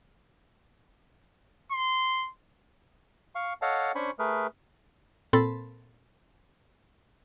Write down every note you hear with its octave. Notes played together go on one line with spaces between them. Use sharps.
C6
F5 C#6
A4 C#5 D#5 F5 F#5 A5
C#4 D4 C5 G#5 B5 C#6
A3 G#4 A#4 B4
A#2 C4 A4 B5 C6 A6